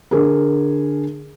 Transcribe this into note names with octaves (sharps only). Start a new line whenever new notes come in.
D3 G#4 A#4